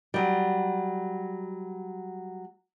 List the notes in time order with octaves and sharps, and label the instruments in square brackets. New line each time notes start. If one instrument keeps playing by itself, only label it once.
[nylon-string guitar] F#3 G3